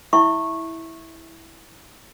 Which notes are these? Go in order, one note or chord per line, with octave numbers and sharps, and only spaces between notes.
E4 E5 C#6